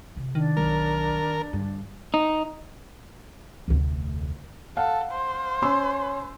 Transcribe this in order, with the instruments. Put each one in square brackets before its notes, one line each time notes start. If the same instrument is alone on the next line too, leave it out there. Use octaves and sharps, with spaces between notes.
[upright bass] C3
[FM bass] D#3 [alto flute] D4
[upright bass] B1 F#3 [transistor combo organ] A#4
[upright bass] G2 D3
[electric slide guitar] D#4
[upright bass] F1 D2
[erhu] A4 [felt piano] F5 F#5
[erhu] C5
[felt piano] C#4 C6 E6